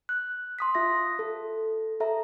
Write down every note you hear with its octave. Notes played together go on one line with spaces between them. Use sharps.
F#6
C6 D#6 B6
F4 E5 A#6
A4
A4 E5 A#5